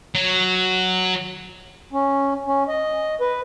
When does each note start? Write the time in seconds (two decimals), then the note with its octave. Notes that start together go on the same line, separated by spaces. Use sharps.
0.15 F#3
1.93 C#4
2.47 C#4
2.68 D#5
3.21 B4